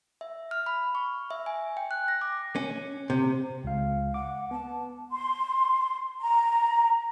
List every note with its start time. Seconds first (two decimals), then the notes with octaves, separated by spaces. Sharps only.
0.21 E5
0.51 F6
0.66 B5
0.95 C#6
1.31 E5
1.46 G#5
1.77 G5
1.91 F#6
2.08 A#6
2.21 D6
2.56 C#4
3.10 C3
3.64 C#2 F5
4.14 F#5 D6
4.51 B3 A5
5.12 C6
6.20 A#5